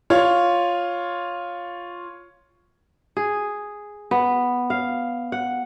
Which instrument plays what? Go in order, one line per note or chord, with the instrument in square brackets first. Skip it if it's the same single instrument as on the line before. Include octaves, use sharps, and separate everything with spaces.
[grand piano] F4 C#5
[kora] G#4
B3
F5
F#5